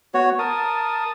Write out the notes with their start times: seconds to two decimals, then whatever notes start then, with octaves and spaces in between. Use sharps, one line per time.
0.14 B3 F#4 C#5
0.39 A#4 A5 D#6